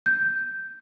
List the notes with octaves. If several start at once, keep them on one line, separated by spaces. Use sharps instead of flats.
G6